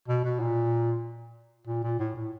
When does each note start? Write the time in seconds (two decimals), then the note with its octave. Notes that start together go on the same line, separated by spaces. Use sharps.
0.09 B2
0.24 B2
0.40 A#2
1.67 A#2
1.84 A#2
1.99 A2
2.15 A2